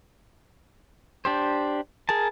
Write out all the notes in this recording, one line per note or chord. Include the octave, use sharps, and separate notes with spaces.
D4 G4 C5
G#4 A#4 A5